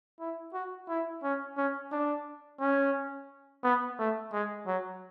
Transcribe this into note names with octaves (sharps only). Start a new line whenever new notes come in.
E4
F#4
E4
C#4
C#4
D4
C#4
B3
A3
G#3
F#3